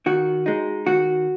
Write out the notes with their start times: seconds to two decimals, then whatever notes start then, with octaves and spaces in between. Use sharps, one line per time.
0.06 D#3 F#4
0.46 G#3 D#4
0.86 D#3 F#4